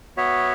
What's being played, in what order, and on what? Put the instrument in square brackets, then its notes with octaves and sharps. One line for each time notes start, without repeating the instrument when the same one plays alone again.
[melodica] B3 F#4 C#5 E5